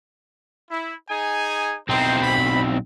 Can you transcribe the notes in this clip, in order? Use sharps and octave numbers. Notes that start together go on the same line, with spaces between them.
E4
D#4 G#4 G#5
B1 C4 D#4 E4 C5
B5